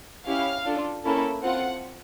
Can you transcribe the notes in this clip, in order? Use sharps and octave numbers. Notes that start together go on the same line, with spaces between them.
C#4 E4 G4 F5
D4 F4 A4
A#3 C#4 E4 A4
C4 F4 A4 F#5